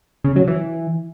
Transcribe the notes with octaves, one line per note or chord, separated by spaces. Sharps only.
C#3
F#3
E3